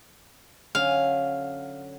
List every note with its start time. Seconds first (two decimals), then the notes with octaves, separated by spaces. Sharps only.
0.75 D3 F#3 C#4 F5